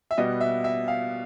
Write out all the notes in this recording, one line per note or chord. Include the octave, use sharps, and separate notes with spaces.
E5
B2 G3 B3 D#5
E5
E5
F5